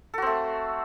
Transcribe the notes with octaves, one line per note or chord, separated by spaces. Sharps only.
A3 C4 F#4 A4